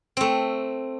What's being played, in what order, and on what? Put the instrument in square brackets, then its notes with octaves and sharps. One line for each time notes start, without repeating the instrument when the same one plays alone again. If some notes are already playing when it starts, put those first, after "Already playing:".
[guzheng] A3 C4